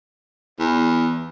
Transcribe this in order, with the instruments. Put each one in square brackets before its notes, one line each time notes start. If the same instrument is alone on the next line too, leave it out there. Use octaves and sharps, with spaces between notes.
[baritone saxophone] E2